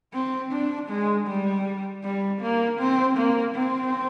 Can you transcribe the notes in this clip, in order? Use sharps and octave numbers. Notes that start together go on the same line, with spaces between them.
C4
D4
G#3
G3
G3
A#3
C4
A#3
C4